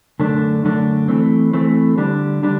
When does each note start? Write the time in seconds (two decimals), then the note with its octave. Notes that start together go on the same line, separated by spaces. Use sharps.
0.20 F#2 D3 A3 D4
0.64 F#2 D3 A3 D4
1.08 E3 A3 C4
1.53 E3 A3 C4
1.97 D3 G3 D4
2.43 D3 G3 D4